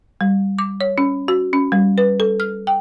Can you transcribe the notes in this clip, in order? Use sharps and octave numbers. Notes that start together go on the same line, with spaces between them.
G3
D6
C#5
C#4
F#4
C#4
G3
B4
A4
F6
G5